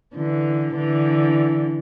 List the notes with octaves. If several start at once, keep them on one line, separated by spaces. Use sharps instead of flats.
D3 E3
D3 E3